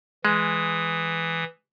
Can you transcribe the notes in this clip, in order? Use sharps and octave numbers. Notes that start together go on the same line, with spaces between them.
E3 G#3 D#6